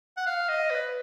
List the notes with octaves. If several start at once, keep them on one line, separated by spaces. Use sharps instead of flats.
F#5
F5
D#5
B4